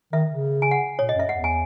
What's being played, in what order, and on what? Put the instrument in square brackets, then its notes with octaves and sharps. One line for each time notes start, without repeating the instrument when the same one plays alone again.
[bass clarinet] D#3 [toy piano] E5
[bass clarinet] C#3
[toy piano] G#5
F#5
[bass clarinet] A#2 [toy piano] C#5
[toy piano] D#5
[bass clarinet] F#2
[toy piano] E5
[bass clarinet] E2 [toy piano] F#5
[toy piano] G#5